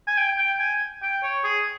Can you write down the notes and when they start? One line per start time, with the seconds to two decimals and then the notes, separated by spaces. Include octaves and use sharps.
0.07 G#5
0.18 G5
0.38 G5
0.60 G#5
1.02 G5
1.23 C#5
1.44 G#4